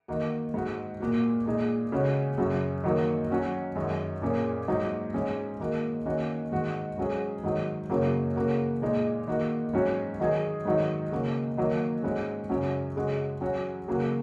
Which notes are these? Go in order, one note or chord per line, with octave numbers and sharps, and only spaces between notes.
D#3 A#3 F#4
G#2 G#3 F#4
A#2 A#3 F#4
A#2 G#3 D#4 G#4
C#3 G#3 C#4 F#4
F#2 C#3 F#3
D#3 F#3 A#3 D#4
F#3 C#4 F#4
F#2 D#3 G#3
A#2 A#3 C#4 G#4
G#2 F#3 D#4
G#2 G#3 C#4
D#3 A#3 F#4
D#3 A#3 C#4 F#4
G#2 D#3 G#3 F#4
G#2 F#3 C#4 G#4
G#2 D#3 F#3 D#4
F#2 C#3 F#3 A#3
C#3 A#3 F#4
A#2 G#3 D#4
D#3 A#3 F#4
G#2 F#3 C#4 F#4
D#3 F#3 D#4 G#4
G#2 D#3 F#3 D#4
C#3 A#3 F#4
D#3 F#3 A#3
G#2 G#3 C#4 F#4
F#2 C#3 F#3 C#4
C#3 G#3 F#4
F#3 C#4 F#4
C#3 F#3 A#3 F#4